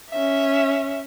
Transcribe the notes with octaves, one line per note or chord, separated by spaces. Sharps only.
C#4 E5